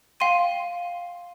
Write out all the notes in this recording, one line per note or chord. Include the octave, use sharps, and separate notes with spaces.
F5 G5 C6 D#7